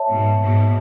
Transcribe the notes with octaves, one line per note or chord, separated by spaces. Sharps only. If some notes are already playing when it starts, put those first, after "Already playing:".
Already playing: C#5 E5 A5
G#2 B2
G#2 B2